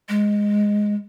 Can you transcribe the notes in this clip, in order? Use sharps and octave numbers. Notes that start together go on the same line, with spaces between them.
G#3